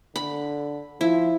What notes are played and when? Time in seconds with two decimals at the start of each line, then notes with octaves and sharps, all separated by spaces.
0.16 D3 B5
1.01 F3 E4